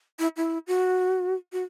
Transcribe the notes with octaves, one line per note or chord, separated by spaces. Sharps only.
E4
E4
F#4
F#4